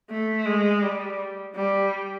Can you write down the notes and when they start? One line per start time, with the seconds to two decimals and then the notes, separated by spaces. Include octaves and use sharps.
0.10 A3
0.46 G#3
0.82 G3
1.55 G3